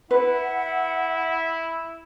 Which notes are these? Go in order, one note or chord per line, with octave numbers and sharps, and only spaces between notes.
E4 B4 F#5